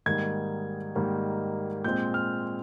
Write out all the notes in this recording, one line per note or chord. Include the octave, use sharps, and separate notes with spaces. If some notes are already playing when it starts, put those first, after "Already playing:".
G#2 D#3 G3 A#3 G#6
G#2 D#3 G3 A#3
A#2 G#3 C4 G6
F6